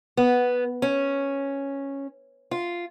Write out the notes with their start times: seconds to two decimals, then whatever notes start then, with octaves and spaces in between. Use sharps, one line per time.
0.17 B3
0.82 C#4
2.51 F4